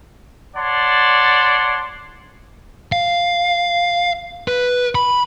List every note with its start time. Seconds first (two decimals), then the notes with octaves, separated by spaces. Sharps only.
0.56 C#5 D5 F#5 A5 C6
2.92 F5
4.48 B4
4.95 B5